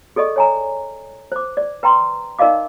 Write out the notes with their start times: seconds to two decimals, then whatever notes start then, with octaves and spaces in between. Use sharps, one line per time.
0.16 G#4 A4 D5 D#5 C#6
0.36 C#5 G#5 A#5
1.32 C5 D6
1.57 D5
1.83 B4 G5 A#5 C6
2.39 D#4 A#4 D5 D#5 F5 D6